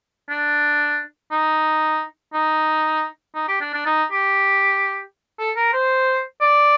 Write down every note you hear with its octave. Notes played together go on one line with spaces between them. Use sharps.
D4
D#4
D#4
D#4
G4
D4
D4
D#4
G4
A4
A#4
C5
D5